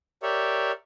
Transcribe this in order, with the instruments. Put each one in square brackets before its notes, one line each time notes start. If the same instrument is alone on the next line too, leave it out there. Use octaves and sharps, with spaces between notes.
[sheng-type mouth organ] G4 A#4 C#5 D5 E5